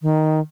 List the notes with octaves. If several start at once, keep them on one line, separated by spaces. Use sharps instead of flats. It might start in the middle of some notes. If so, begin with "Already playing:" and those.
D#3